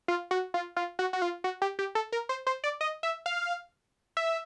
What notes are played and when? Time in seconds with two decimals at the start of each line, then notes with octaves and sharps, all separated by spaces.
0.08 F4
0.31 F#4
0.54 F4
0.76 F4
0.99 F#4
1.13 F#4
1.22 F4
1.44 F#4
1.62 G4
1.79 G4
1.95 A4
2.12 A#4
2.29 C5
2.47 C5
2.64 D5
2.81 D#5
3.03 E5
3.26 F5
4.17 E5